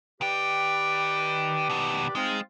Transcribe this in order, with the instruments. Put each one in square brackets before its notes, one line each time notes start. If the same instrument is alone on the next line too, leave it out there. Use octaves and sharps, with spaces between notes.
[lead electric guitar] D#3 G5 [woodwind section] G4 B4 D5
[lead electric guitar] B2 D#3
[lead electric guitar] G#3 [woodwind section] C4 D#4 F4